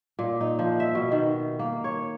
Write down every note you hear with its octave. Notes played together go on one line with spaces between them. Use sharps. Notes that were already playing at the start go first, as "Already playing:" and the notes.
A#2
D#4
F3
E5
B2
D#3
A#3
C#5